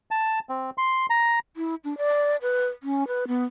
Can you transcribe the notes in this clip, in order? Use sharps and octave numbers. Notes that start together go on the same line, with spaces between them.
A5
C4
C6
A#5
E4
D4
D5
B4
C#4
B4
B3